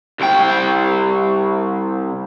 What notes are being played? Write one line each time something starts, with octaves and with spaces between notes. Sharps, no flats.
C2 G5